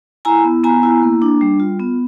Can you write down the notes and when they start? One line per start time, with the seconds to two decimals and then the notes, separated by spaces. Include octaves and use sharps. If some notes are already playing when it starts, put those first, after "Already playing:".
0.25 E4 G#5 A#5
0.45 B3
0.64 B3 G#5 A#5
0.83 E4
1.02 A#3
1.22 D4
1.41 G3
1.60 F4
1.80 B3